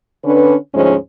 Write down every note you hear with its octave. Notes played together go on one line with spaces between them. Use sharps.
D3 C#4 D4 B4
D2 G#2 F3 G#3 C#4 C5